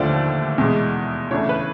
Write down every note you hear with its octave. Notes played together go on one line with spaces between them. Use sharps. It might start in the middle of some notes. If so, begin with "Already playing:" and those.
Already playing: D#2 D3 F3 A3 D5
E2 B2 G#3
C#3 E3 A3 D4 C#5
B4